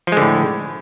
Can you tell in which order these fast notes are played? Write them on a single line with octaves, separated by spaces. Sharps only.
F3 G#3 D3 A2